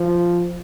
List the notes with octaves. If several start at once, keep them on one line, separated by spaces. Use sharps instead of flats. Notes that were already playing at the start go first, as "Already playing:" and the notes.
Already playing: F3